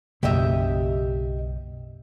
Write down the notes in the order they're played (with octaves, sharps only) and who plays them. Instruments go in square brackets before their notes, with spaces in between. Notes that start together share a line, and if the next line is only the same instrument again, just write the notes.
[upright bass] B1 [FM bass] F#2 [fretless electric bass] C#3 A#3 [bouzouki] G4 D#5 E5